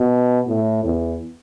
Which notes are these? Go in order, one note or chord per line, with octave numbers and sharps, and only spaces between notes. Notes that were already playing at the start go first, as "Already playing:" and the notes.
Already playing: B2
A2
E2